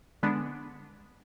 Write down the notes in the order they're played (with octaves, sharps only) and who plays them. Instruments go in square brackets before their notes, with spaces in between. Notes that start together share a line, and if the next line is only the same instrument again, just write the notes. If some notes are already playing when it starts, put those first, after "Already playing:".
[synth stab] D3 G#3 B3 D4